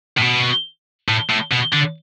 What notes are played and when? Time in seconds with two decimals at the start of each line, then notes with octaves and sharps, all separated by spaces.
0.17 A2
0.21 B2
1.08 A2
1.30 A2
1.52 B2
1.73 D3